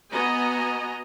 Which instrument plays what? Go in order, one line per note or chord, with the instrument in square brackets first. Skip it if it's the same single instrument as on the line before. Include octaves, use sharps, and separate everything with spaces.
[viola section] B3 F#4 D#5 G#5 A#5